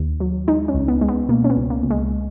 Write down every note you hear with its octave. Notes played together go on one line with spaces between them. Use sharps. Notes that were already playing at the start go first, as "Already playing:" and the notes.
Already playing: D#2
F#3
G#3 D#4
C#4
C#2
B3
G#3
B3
B2 A#3
C#4
B3
C#2
A#3
C#2
G#3